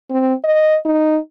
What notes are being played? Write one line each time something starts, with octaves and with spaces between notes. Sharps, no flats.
C4
D#5
D#4